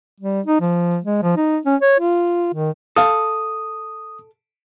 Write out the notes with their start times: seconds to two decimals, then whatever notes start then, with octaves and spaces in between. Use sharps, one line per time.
0.20 G3
0.46 D#4
0.61 F3
1.04 G#3
1.22 F3
1.37 D#4
1.65 C#4
1.82 C#5
2.00 F4
2.54 D#3
2.96 A4 F5 D#6